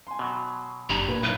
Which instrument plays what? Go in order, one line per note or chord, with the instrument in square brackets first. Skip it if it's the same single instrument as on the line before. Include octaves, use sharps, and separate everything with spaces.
[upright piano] G#5 C6
[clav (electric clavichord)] B2 F#3
[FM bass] F#1 [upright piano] D4 G4 [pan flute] A#5
[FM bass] A#2 [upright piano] B4 G#6
[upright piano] B1 E4 G7 [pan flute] B4